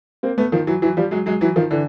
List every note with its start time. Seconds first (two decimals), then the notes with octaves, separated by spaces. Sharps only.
0.23 A#3 C4
0.38 A3 B3
0.52 D#3 F3
0.67 E3 F#3
0.82 E3 F#3
0.97 F3 G3
1.11 F#3 G#3
1.26 F#3 G#3
1.41 E3 F#3
1.56 D#3 F3
1.71 D3 E3